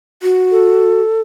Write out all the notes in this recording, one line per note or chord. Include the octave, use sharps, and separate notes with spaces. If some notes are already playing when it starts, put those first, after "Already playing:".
F#4
A4